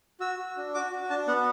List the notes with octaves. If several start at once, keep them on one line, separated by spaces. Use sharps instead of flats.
F#4 E6
F#4
D4
F#4 D6
F#4
D4 A5
B3 F#5